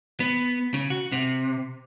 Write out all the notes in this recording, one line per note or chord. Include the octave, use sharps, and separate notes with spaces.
B3
C#3
F#4
C3